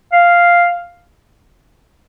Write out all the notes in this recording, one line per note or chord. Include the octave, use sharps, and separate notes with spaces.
F5